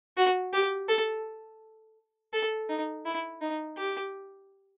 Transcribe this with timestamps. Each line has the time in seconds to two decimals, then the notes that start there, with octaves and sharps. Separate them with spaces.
0.17 F#4
0.53 G4
0.89 A4
2.33 A4
2.69 D#4
3.05 E4
3.41 D#4
3.77 G4